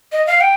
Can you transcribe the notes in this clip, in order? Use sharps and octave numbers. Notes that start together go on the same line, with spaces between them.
D#5
F5
G5